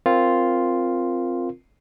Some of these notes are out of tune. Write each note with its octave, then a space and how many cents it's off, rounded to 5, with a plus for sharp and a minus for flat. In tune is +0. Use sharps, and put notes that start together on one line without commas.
C4 +5 F4 +0 A#4 +0